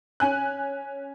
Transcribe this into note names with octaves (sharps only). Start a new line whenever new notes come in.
C#4 G#5 F#6